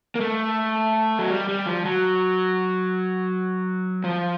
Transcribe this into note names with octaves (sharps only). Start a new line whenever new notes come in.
A#3
A3
F#3
G3
G3
F3
F#3
F3